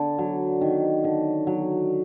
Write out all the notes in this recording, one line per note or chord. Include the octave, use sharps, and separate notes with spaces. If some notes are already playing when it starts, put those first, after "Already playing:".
Already playing: D3
F#3
D#3
D3
F#3